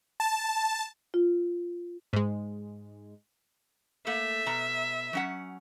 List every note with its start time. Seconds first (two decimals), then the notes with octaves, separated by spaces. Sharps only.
0.20 A5
1.14 F4
2.13 G#2 G#3
4.07 A3 A#3 E5
4.46 B2 A#5
5.13 F#3 C#4 F#5